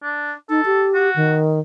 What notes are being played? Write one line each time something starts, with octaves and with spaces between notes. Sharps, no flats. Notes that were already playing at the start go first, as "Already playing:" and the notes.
D4
D#4 A4
G4
F#4
D#3